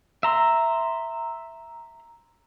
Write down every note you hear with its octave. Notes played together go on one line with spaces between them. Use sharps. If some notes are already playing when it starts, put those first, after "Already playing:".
E5 A#5 C6